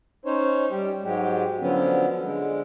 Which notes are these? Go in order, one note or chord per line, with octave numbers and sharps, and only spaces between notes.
C#4 D#4 C5 C#5
G3 G4
G#2 F#3 G#3 G4
D3 F3 F#3 B3 C#4
D3 G#3